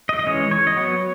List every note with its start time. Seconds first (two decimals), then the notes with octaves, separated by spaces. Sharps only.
0.09 D#5
0.19 D#5
0.27 E3 G#3 C#4 C#5
0.51 C#5
0.67 D#5
0.77 F#3 B3 C#5